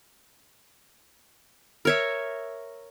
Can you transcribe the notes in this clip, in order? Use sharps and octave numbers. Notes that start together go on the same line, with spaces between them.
A#4 C#5 E5